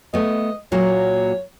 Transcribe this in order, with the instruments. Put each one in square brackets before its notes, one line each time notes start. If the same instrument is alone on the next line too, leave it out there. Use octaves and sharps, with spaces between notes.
[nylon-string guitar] A3 B3 [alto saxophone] D#5
[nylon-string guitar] A#2 F#3 A#3 [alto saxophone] C#5